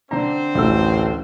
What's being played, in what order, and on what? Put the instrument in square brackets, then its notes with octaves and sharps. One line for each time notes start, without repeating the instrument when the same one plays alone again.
[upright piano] D3 D4 A#5 [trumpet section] C4 C5
[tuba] A1 [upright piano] D2 A3 E6